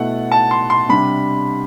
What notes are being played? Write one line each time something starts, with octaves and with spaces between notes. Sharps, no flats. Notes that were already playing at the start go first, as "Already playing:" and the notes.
Already playing: B2 A3 E4 F#5
A5
C6
C6
C3 G3 D4 B5